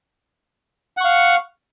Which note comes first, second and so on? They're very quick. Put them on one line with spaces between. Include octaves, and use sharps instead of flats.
F#5 C#6 F5